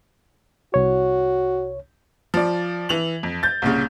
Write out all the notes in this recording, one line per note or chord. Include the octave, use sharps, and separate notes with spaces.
C2 F#4 C#5
F3 D5
E3 F7 F#7
F2
G6 A6
C2 A#2 C#3